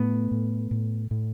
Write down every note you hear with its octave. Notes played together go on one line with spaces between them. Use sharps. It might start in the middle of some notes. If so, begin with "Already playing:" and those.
Already playing: A2 A3 B3
A2
A2
A2